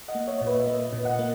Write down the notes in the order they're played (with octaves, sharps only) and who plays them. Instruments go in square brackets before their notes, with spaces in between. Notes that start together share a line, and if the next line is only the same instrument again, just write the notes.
[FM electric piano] D#5 F#5
A#3
C#5 E5
A#2 C#5
B4 D#5
E5
A#3 B4 D#5
A#2
D#5 F#5
A#3